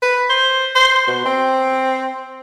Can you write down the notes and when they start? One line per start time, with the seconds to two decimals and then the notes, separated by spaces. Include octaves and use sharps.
0.02 B4
0.30 C5
0.75 C5
1.07 B2
1.26 C4